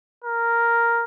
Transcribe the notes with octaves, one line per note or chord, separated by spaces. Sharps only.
A#4